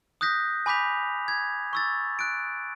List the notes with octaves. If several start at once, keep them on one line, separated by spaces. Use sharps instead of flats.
D#6 F#6 G6 A#6 B6
G#5 B5 D6 G6 B6 F7
G#6
C#6 E6 A6
F#6 D7